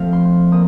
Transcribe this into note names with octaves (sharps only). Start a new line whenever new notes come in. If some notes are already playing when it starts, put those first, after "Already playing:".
Already playing: F3 A3 C4 F5
C6
A#3 D#6